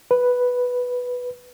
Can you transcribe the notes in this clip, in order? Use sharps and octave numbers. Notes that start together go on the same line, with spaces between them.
B4